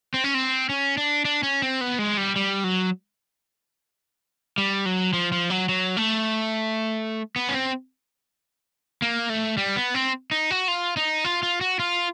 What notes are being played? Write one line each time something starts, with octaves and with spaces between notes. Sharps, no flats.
C4
C#4
C4
C#4
D4
D4
C#4
C4
B3
G#3
G3
G3
F#3
G3
F#3
F3
F3
F#3
F#3
A3
B3
C#4
C4
A#3
A3
G3
B3
C4
D#4
F#4
F4
D#4
F4
F4
F#4
F4